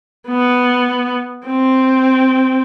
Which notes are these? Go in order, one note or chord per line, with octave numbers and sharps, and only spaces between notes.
B3
C4